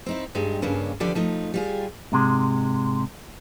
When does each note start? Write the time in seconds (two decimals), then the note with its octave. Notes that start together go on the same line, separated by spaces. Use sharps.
0.06 C4 D#4 E4
0.35 G2 G3 G#3 D#4
0.62 G2 C#3 A#3 C#4 D4
1.00 E2 D3 F3 G4 D5
1.15 F3 A3 D#4
1.54 G3 F4 G#4
2.12 G#2 C3 G#3